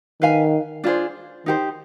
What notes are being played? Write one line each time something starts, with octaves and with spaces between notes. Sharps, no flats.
D#3 B4 F5 G#5
D4 F4 G#4 C5
D#3 D#4 G4 C5